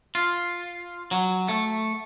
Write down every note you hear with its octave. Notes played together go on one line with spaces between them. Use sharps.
F4
F#3
A3